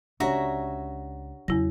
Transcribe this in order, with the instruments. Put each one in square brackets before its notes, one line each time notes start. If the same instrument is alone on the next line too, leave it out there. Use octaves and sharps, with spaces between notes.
[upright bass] C#2 C#4 [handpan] D4 G4 C#5 [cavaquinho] F#4 E5 A#5
[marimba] E2 E4 A#6 [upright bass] C#3 [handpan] F#3